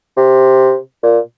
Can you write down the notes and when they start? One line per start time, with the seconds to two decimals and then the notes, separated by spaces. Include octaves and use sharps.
0.17 C3
1.03 A#2